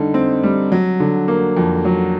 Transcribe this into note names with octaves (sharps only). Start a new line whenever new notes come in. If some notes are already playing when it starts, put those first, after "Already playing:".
Already playing: D3 G3 D#4
C4
G3
F#3
D3
A#3
F2
F#3